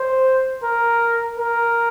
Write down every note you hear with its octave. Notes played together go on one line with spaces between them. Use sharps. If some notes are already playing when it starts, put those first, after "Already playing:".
Already playing: C5
A#4
A#4